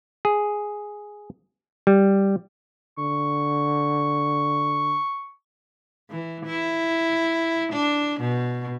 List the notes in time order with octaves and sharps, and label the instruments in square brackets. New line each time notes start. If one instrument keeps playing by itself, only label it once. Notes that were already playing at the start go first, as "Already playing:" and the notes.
[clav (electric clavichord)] G#4
G3
[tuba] D3 [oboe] C#6
[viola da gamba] E3
E4
D4
B2